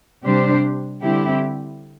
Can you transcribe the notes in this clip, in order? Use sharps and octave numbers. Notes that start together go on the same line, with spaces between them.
C3 G3 D4 G4 C5
D3 G3 C4 E4 G4